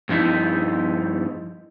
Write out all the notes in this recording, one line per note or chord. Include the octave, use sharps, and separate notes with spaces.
G2 F3 D#4 E4